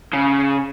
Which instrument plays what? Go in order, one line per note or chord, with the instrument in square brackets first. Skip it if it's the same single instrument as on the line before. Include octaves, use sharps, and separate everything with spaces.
[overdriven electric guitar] C#3